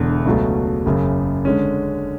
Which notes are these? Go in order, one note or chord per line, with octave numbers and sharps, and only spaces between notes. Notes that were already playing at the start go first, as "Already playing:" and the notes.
Already playing: E1 E2 D3
C#2 B2 F#3 A3
F#1 F#2 C#3
D3 G#3 C#4